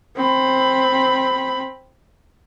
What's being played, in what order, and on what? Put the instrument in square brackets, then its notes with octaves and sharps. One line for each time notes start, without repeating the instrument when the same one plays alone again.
[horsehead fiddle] C4 B5